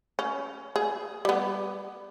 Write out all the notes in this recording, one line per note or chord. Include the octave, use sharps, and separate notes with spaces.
C#4
G#4
G3 B3